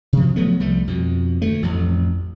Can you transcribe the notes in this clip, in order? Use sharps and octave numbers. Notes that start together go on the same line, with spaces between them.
C3 F3
F3 F#3 A3 B3
C2 F3 G3 A3
F2 B2
D2 G#3 A3
A1 F2